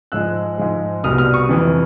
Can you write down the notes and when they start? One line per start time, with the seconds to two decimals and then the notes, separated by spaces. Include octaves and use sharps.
0.12 G#2 F3 G#3 E6 F#6
0.58 G#2 F3 G#3
1.04 C2 B2 G3 D#6 F6
1.18 D#6 F6
1.34 C#6 D#6
1.49 F2 C3 E3